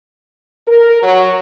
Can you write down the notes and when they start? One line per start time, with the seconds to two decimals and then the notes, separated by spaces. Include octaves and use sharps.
0.66 A#4
1.02 F#3